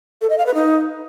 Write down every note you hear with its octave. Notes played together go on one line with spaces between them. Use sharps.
A4
D#5
F5
B4
D#4